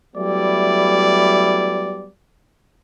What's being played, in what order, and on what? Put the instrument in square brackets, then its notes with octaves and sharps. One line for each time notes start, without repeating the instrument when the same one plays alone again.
[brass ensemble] F#3 G3 A3 B3 E4 D5